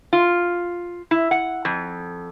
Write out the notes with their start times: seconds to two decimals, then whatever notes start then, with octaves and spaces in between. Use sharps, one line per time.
0.13 F4
1.11 E4
1.31 F#5
1.65 F2